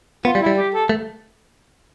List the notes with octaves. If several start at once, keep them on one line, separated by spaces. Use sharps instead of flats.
B3 F4
G3
E4
G3
G4
A4
A3